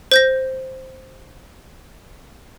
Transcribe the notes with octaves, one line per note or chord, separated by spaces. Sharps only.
C5 G6 A#6